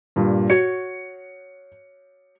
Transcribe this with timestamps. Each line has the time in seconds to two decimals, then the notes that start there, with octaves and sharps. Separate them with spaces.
0.16 G2 A#2
0.50 F#4 C#5 C#7